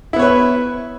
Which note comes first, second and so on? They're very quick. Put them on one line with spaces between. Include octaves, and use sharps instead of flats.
E4 B3 C#5 B4